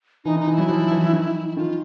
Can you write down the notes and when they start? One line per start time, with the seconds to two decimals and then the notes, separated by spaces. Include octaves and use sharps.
0.25 E3 D#4
0.36 D#3
0.40 D#4
0.47 E3
0.54 F#3 E4
0.69 F3
0.91 E3
1.13 D#3
1.48 E4
1.57 D#3 F4